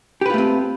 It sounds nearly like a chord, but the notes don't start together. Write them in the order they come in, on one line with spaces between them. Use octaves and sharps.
G4 B4 F4 A3 C4